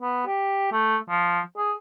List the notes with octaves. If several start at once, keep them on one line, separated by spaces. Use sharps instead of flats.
B3
G4
A3
F3
G#4